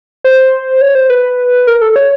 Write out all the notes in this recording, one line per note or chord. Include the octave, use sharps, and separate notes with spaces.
C5
C#5
C5
B4
A#4
A4
C#5